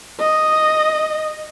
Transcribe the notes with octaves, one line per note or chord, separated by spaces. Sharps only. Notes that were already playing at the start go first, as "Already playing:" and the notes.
D#5